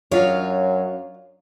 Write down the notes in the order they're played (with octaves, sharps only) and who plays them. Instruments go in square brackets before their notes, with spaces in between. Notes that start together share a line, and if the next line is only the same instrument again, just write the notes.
[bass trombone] F#2 [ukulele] D4 F4 D#5 [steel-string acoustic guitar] C#5 F5